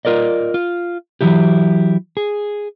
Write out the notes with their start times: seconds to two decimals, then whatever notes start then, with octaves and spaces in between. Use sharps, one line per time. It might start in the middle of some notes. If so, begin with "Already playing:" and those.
0.05 F4 A#4 D5 D#5
0.54 F4
1.21 E3 F#3 E4 G4
2.17 G#4